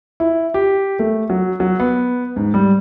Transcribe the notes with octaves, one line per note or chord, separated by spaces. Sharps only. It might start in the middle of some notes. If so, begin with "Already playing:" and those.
E4
G4
A3
F#3
F#3
B3
G#2
G3